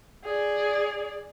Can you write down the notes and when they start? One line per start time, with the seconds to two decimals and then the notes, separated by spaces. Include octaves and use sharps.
0.25 G#4 D5